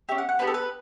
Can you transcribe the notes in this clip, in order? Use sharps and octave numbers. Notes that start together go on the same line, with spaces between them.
C#4 G4 E5
F#5
F#5
B3 D4 G4 B4
A4
B4